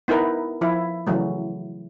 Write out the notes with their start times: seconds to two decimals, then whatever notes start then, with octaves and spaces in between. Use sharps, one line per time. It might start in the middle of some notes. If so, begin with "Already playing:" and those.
0.08 B3 D#4 E4 A#4 B4
0.61 F3 E4
1.07 C#3 E3 F#3 A3